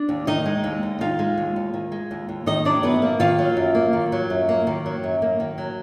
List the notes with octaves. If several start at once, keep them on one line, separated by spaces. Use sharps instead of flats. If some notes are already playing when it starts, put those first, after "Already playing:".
Already playing: D4 D5
D#2
D#3 D#4 D#5
G#3
D#2
D#2
D#3 F4 F5
G#3
D#2
D#2
D#3
G#3
D#2
D#2
D#3 D#4 D#5
F#3 D4 D5
F#2 B3 B4
A#3
D#3 F4 F5
F#3
F#2
A#3
D#3
F#3
F#2
A#3
D#3
F#3
F#2
A#3
D#3
F#3